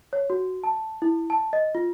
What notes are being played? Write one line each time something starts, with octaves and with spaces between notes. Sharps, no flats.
C#5
F#4
A5
E4
A5
D#5
F4